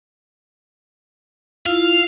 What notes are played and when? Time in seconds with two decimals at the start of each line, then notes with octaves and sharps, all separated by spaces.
1.66 E4 F4 F5